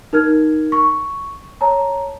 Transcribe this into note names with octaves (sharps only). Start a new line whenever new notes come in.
D#4 A#4 F6 G#6
C#6
C#5 A5 A#5